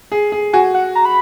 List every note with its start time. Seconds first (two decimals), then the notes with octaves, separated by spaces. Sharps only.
0.12 G#4
0.32 G#4
0.53 F#4 G#5
0.74 F#5
0.95 A#5
1.05 B5